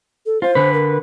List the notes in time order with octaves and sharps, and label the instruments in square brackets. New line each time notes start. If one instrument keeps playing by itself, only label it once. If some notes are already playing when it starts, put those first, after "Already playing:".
[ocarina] A4
[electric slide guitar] F4 [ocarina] C5
[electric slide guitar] D3 B4
[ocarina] A#4